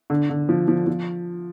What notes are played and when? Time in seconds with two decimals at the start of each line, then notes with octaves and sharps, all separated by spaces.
0.10 D3
0.30 D3
0.49 F3
0.68 F3
0.87 F3